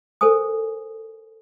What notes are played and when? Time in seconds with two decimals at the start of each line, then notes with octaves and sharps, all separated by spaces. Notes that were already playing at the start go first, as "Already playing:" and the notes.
0.21 A4 A#4 C5 G#5 D#6